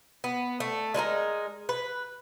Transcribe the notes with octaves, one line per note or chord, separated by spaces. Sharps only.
B3
A3
G#3 D#4 E4 A#4
B4